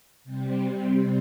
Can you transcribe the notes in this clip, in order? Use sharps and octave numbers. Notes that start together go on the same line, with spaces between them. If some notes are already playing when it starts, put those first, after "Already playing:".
C3 G3 C4